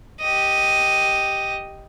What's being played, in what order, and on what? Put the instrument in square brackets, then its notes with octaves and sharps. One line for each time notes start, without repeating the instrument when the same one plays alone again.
[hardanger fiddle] G4 D#5